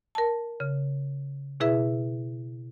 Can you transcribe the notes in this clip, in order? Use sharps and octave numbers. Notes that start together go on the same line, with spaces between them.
A#4 A5
C#3
B2 E4 G#4 B4 E5